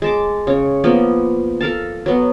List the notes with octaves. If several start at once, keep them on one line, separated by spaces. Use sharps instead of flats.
G#3 A5 D6
C#3 C#5
F3 A#3 B3
A4 A#4 F5 A5
F#3 B3